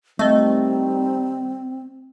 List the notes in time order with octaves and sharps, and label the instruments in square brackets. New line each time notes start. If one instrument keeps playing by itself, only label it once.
[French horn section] D#3 G3 [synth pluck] A3 [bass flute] C4 [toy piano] D#5 E5